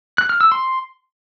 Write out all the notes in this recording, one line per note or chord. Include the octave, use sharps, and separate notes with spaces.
F#6
F6
E6
C6